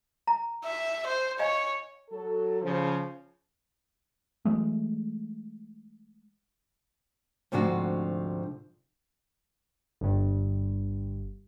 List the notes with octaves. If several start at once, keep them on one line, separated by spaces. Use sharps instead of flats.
A#5
E5
C5
C#5 D#5 F5 G#5
F#3 A4
C#3 F3
E3 F#3 G#3 A3
D2 G#2 C3 F3 D4 F#4
G1 G2